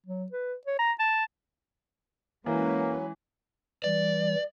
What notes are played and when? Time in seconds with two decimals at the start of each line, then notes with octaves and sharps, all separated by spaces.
0.06 F#3
0.32 B4
0.66 C#5
0.79 A#5
0.99 A5
2.46 E3 F#3 G#3 A#3 C#4 B4
3.84 E3 G3 D5